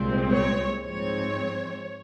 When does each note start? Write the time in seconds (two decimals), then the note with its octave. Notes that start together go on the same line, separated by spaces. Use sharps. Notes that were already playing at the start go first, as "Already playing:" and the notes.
Already playing: C2 A#2 G#3 C4
0.31 C#5
0.83 G#2 F3 G#3 C4 C#5